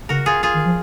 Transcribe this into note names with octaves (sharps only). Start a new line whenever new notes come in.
C#3 F#4 A#4
F4 G#4
F4 G#4
D#3
F3